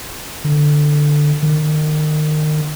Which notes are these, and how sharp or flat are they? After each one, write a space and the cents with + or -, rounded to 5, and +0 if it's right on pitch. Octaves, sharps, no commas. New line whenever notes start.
D3 +10
D#3 -30